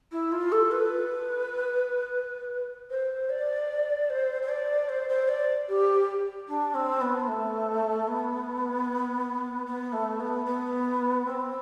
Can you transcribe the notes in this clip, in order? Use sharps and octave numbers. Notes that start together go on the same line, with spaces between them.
E4
F4
A4
B4
C5
D5
C5
C5
D5
C5
C5
D5
G4
D4
C4
B3
A3
B3
B3
A3
B3
B3
C4